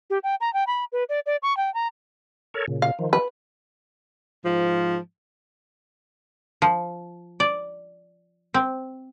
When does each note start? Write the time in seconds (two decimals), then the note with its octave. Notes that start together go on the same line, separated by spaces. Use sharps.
0.10 G4
0.23 G5
0.41 A#5
0.53 G5
0.67 B5
0.92 B4
1.09 D5
1.26 D5
1.42 C#6
1.57 G5
1.74 A#5
2.54 A4 A#4 C#5
2.68 A#2 C#3
2.82 F5
2.99 D#3 F3
3.13 B4
4.43 G#2 F3
6.62 F3
7.40 D5
8.54 C4